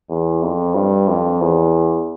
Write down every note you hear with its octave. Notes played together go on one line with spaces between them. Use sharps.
E2
F2
G2
F2
E2